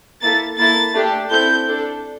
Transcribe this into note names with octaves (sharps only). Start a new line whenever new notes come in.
A#3 E4 A4 A6
A#3 E4 A4 A6
A3 D4 G4
C4 E4 A4 G6
D4 A4